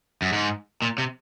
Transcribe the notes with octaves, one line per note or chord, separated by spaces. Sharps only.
F#2
G#2
A#2
C3